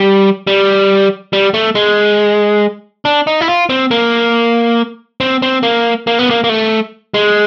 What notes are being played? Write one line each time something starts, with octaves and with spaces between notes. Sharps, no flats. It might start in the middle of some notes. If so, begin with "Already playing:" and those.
Already playing: G3
G3
G3
A3
G#3
D4
D#4
E4
F4
C4
A#3
C4
C4
A#3
A#3
B3
A#3
A#3
A3
G#3